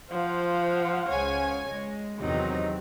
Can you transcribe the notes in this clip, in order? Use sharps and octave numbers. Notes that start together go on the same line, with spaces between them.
F3 C5 F5 F#5
C#2 C#3 C#5 G#5
G#3
E2 C3 D#3 F#3 C4 D#4